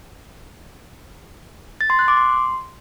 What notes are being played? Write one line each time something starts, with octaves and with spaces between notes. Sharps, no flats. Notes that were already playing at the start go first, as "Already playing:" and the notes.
A6
C6
F#6
D6
C6